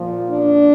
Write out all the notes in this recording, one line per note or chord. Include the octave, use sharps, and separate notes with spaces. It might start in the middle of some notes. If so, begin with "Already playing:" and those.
Already playing: A#2 F3
D4